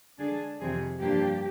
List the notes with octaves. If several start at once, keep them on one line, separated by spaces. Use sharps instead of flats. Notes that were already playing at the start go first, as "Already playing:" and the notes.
D3 G#3 D4 G#4
F2 C3 D#3 G#4
G2 F3 A#3 D4 G4